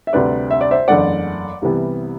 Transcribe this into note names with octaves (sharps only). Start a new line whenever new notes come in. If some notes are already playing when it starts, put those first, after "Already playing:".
E5
D2 C3 G3 B4 D5
E5
D5
C5 E5
F#1 E2 D3 A3 D5 F#5
C2 C3 E3 G3 B3